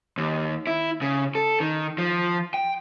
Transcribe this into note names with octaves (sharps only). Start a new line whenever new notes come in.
D#2
E4
C#3
A4
D#3
F3
G5